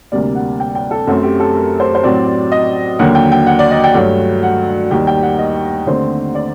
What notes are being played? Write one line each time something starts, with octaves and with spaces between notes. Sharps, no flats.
D2 C3 G3 A#3 D5
F#5
G5
G5
A4
F#2 F#3 A3 C4 F#4
G4
A4
A#4
C5
C5
A2 F#3 C4 D5
D#5
D#2 D3 F#3 A#3 F#5
G5
G5
F#5
D5
D#5
G5
G2 F#3 A3 G5
F#5
D#2 D#3 G3 G5
G5
F#5
D#5
D#2 D3 A3 C4 C5
D5